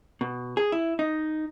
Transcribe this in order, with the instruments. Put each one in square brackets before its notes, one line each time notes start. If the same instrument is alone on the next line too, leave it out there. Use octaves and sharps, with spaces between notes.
[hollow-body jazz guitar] B2
G#4
E4
D#4